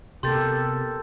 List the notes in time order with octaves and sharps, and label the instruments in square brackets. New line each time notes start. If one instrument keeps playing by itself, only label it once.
[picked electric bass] C3 B3 [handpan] G4 A4 A#4 [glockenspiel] C6 G6 A6